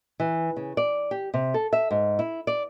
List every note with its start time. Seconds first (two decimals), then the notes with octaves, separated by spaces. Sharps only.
0.20 E3
0.57 C#3
0.77 D5
1.11 G4
1.34 C3
1.54 A4
1.73 E5
1.91 G#2
2.19 E4
2.47 D5